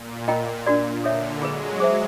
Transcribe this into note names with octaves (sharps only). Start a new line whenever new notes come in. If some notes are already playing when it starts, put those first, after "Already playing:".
Already playing: A#2
A#2 F4 A#4 D#5 G5 A#5
A#2 D4 F#4 A#4 D5
D3 A4 C#5 E5
F#3 G#3 F4 G#4 B4
G#4 C5 E5